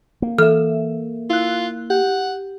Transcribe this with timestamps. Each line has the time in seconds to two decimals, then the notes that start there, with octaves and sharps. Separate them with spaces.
0.22 A#3
0.38 E3 A4 E5 F6
1.30 E4 F4 F#6
1.90 G4 F#5